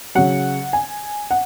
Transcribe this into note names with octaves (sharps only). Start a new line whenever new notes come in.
C#3 F#3 F#5
G#5
F#5